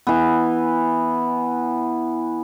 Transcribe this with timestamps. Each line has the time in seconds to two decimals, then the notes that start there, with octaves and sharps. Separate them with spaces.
0.07 E3 B3